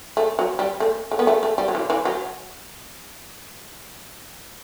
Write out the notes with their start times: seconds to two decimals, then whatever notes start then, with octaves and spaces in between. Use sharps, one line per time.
0.17 A3
0.39 F#3
0.59 G3
0.80 A3
1.11 A3
1.19 B3
1.27 A3
1.43 A3
1.58 G3
1.68 F#3
1.75 E3
1.90 E3
2.05 F#3